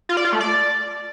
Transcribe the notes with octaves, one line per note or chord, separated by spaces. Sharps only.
F4
D5
F4
A3
D5